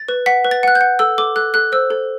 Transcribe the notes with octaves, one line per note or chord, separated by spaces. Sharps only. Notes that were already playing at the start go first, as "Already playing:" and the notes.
Already playing: A6
B4
F#5 B6
B4
A6
F#5 F#6
G6
F#5
A4 E6
A4 D6
A4 F#6
A4 F#6
C5 E6
A4